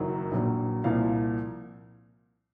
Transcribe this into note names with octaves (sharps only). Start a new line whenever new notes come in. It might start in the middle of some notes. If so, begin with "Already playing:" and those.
Already playing: F#1 F#2 D#3 F#3
A#1 A#2 F#3
C2 A#2 F3 F5